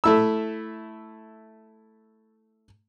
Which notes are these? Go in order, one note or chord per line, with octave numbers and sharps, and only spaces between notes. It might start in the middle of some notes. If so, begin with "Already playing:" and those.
A3 E4 E6